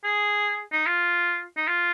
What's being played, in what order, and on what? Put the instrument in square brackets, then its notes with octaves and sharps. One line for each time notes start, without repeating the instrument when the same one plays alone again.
[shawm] G#4
D#4
F4
D#4
F4